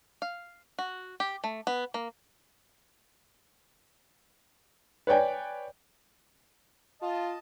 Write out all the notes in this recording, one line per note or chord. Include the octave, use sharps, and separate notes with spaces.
F5
F#4
G4
A3
B3
A#3
B4 C#5 D5 G5 G#5
F4 D#5 A5